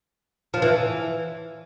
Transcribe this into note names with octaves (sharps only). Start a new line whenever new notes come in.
F3
E3